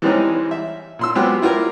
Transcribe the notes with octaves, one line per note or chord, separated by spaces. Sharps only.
E3 G3 G#3 C4 C#4 D#4
E5
A#2 C6 E6
F#3 G#3 B3 C4 F4 G4
E4 F4 G4 A#4